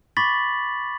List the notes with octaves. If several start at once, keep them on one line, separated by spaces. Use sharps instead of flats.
B5 C#6 D6 A6 B6 F#7